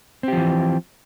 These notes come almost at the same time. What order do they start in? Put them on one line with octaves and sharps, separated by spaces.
C4 G4 F3 E3